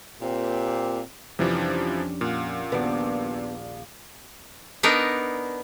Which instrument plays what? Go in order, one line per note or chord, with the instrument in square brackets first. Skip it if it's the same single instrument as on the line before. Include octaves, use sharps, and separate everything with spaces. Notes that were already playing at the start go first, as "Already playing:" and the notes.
[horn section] A#2 C4 G4
[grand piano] F2 G3 [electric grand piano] C3 E3 F3 [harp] C#4 D4
[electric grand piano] A#2 [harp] F5 F#5
[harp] D#1 A#1 D5 [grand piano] G3 D4 F#4 [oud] B3
[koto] B3 D4 D#4 A#4